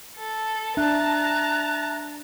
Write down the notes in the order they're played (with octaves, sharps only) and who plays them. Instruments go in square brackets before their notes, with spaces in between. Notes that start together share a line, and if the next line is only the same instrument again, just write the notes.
[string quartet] A4
[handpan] D4 [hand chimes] E5 [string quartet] A5 A#5 [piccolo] F#6